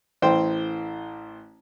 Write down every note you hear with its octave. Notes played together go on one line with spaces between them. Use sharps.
A1 E3 C5 G5